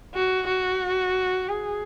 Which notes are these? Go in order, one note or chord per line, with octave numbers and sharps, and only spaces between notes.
F#4
F#4
G#4